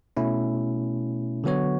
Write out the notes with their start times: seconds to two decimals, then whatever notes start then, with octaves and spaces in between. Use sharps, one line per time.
0.17 B2 A3 C#4 E4
1.44 D3 F#3 B3 F#4 C#5